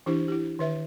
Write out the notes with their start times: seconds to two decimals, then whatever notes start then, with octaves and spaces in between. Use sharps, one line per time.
0.06 E3 D4 E4 G4 C5
0.28 E4 G4
0.59 D#3 B4 E5